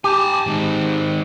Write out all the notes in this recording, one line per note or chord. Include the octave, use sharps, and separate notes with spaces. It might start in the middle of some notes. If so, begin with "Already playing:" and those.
G4 G#5 A5
G#2 D#3